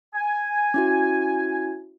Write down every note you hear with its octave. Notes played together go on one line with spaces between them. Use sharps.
G#5
C#4 E4 F#4